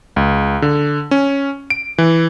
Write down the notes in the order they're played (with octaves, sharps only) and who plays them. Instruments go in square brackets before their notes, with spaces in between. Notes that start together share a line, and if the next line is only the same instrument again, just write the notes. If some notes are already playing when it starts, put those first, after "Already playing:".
[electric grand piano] C#2
D3
C#4
D7
E3